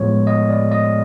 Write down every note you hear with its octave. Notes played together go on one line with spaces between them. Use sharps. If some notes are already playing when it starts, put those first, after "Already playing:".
Already playing: A2 F3 G#3 B3 C5 C#5
D#5
D5
D#5